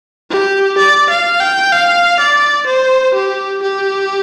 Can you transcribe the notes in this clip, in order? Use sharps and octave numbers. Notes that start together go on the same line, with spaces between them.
G4
D5
F5
G5
F5
D5
C5
G4
G4